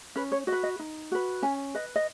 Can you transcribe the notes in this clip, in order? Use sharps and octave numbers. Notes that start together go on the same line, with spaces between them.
C#4 B4
C#5
F#4 D#5
B4
D#5
D#4
F#4 B4
C#4 G#5
B4 D#5
D#5